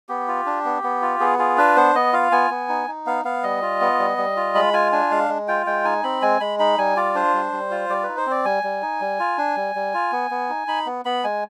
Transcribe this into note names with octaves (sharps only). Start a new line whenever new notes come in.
B3 G4
F4
D4
B3
B3
F4
B3 G#4
F4 G#4
D4 B4
B3 C5
B3 D#5
F4 F5
B3 G#5
B3
D#4
D#4
B3 F5
B3 F5
G3 D#5
F4
B3
G3
G3
F4
G#3 B5
F4 G#5
D4 G#5
G#3 F5
G#3
F4 G5
G#3 G5
D#4 G#5
C4 B5
G#3 G#5
G#3 B5
D#4 B5
G3 G#5
F4 D5
D4 C5
G3
G3
F4
G3 D5
D#4 B4
C5
C4 D5
G3 G#5
G3
D#4
G3
F4
D4
G3
G3
F4
B3
B3
D#4
D#4 B5
B3
B3 B5
G#3 G#5